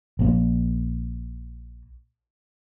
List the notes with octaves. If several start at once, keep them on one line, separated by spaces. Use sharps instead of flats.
A#1 A#3